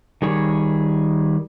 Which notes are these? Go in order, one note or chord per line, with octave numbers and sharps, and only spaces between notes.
D#3 G3 G#4 C#5